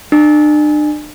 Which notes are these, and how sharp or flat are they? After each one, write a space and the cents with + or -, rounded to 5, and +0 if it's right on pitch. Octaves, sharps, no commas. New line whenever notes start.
D4 +40